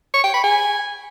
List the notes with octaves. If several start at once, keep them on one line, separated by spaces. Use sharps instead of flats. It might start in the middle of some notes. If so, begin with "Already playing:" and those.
C#6
G5
B5
G#5